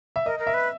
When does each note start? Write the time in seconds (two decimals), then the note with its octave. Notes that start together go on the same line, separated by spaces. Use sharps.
0.16 E5
0.25 A#4 D#5
0.39 A#4
0.47 E5
0.54 B4